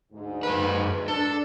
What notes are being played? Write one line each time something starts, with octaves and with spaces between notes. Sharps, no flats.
D2 G#2
F#2 B4
D4 A4